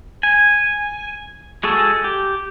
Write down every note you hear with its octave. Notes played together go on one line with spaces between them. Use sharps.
G#5
G#3 F#4 G#4 A4
G4